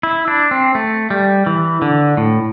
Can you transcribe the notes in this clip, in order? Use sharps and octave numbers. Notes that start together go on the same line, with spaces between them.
E4
D4
C4
A3
G3
E3
D3
A2